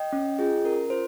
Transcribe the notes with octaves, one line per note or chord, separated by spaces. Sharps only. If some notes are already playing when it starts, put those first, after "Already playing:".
Already playing: D#5 G5
C#4
F4 G#4
C#4 A#4
F4 C5